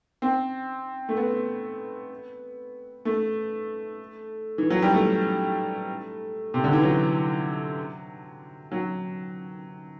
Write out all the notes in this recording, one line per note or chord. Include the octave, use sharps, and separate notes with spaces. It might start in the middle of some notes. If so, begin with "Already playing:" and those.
C4
A3
B3
A3
E3
F#3
G3
A3
C3
D3
E3
F#3
F#3